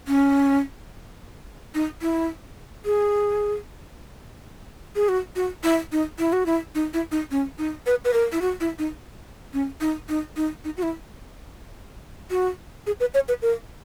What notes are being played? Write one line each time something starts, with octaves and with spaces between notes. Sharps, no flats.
C#4
D#4
E4
G#4
G#4
F#4
F#4
E4
D#4
E4
F#4
E4
D#4
E4
D#4
C#4
D#4
B4
B4
A#4
E4
F#4
E4
D#4
C#4
D#4
D#4
D#4
D#4
F#4
E4
F#4
G#4
B4
C#5
B4
A#4